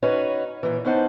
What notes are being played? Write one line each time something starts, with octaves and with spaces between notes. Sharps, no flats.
C#4 D#4 F#4 B4 C#5
A#2 E3
B3 C#4 D#4 C5 F#5 A5